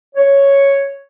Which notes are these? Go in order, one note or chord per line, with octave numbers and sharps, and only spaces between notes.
C#5